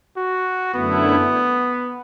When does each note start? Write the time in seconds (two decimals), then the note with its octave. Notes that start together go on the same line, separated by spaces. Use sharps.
0.17 F#4
0.74 F#2 D3 A3 B3 E4